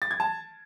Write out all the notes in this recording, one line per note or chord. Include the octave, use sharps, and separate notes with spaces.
A6
G#6
A5